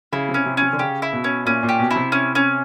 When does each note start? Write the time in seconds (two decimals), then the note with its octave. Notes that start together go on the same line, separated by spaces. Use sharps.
0.13 C#3 E4
0.29 C3
0.34 C#4
0.46 C3
0.57 C#4
0.62 C3
0.73 D3
0.79 C#3 G4
1.02 E4
1.13 B2
1.24 C#4
1.45 A#2 C#4
1.63 A#2
1.69 G4
1.80 B2
1.91 E4
1.96 C3
2.12 C#4
2.35 C#4